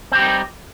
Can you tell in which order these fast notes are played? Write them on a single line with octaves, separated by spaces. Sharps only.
C4 G4 G3 D#4